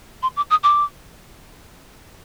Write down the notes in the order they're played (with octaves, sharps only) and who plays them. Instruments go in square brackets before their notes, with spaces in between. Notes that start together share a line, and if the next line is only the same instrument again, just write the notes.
[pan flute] C6
D6
D#6
D6